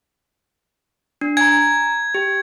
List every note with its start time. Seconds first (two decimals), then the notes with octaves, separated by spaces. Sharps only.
1.21 D4
1.37 G#5 A#5 G#6
2.15 G4